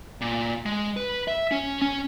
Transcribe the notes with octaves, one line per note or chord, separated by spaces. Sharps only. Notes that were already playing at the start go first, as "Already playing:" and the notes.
A#2
G#3
B4
E5
C#4
C#4